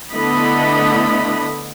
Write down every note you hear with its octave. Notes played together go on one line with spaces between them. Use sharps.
D3 A3 B3 E4 D#5 B5